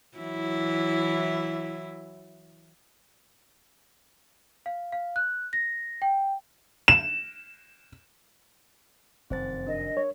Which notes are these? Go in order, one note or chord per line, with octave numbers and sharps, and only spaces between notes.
E3 F#3 E4
F5
F5
F#6
A#6
G5
E7
F1 F#2 D#3 C4 C5 A6
D4 A#4 D#5
C#5